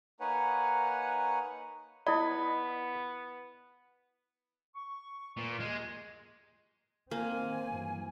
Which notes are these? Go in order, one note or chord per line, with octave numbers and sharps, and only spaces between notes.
A#3 D#4 B4 C#5 F#5 G#5
B3 E4 D5 D#5 B5
C#6
A#2 B4
D#2 G#3 G#4 C6
D#3 A#3 C4 G#5
G2 E3 F#3